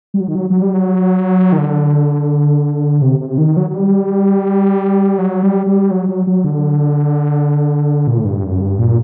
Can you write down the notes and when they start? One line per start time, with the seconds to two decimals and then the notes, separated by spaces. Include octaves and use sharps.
0.14 G3
0.20 F#3
0.28 D#3
0.35 F#3
0.50 F#3
0.62 G3
0.74 F#3
1.52 D#3
1.58 D3
3.02 C3
3.20 C3
3.38 D#3
3.57 F#3
3.70 F#3
3.75 G3
5.18 F#3
5.43 G3
5.67 G3
5.91 F#3
6.09 F#3
6.27 F#3
6.44 D3
8.07 A#2
8.18 A2
8.25 G2
8.43 F#2
8.61 G2
8.79 A#2